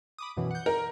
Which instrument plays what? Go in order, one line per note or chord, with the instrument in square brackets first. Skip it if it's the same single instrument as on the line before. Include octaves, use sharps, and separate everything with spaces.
[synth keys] B5 D6 D#6
F#2 B2 E3
F#5 G6
[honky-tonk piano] A#4